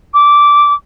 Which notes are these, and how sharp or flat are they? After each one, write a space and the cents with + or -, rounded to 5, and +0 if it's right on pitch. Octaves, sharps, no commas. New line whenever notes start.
D6 -10